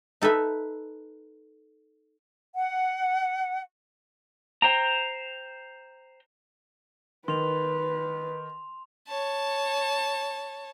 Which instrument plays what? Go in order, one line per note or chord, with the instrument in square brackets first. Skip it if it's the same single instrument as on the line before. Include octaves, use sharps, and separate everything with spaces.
[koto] D#4 A4 B4 E5
[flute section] F#5
[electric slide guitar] C5 G5 A#5
[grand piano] D#3 [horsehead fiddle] B4 [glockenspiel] C6 F7
[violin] C#5 A5